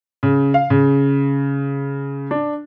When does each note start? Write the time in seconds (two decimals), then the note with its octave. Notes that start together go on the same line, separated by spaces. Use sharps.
0.23 C#3
0.54 F5
0.70 C#3
2.31 D4